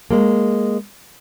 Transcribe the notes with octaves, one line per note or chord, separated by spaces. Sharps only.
G#3 A#3